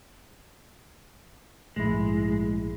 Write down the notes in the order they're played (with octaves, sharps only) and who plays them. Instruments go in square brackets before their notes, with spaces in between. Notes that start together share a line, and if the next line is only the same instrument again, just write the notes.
[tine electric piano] A#1 E4 [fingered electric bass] G#2 A3 [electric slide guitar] G#3